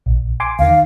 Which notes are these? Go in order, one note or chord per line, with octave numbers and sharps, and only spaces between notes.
A#1
G#5 C6 D6
D#2 D#3 F5